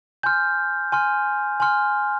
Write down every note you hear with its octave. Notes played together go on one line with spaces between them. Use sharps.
G#5 C6 F6 G6
G#5 C6 F6
G#5 C6 F6